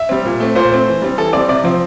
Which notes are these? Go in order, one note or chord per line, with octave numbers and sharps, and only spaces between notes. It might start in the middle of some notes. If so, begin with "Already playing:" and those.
Already playing: E5
G3 C4
A#2
A3 C4
A#2 C5
A3 C4
E3
G3 C4
E3 A4
G3 C4 D5
C3 D5
F3 C4